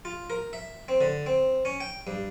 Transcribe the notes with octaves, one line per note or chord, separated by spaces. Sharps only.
F4
A#4
E5
C4
D3
C4
C#4
G5
G2